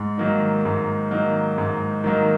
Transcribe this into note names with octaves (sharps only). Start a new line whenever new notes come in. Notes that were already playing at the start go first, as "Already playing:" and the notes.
Already playing: G#2
D#3 F#3 A#3 D#4
G#2
D#3 F#3 A#3 D#4
G#2
D#3 F#3 A#3 D#4